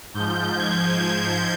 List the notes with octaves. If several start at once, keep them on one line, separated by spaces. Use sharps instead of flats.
G#2 F3 G6
G#6
G6